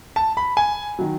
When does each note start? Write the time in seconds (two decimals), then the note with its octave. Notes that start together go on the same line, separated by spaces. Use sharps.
0.16 A5
0.37 B5
0.57 G#5
0.99 D#3 F#3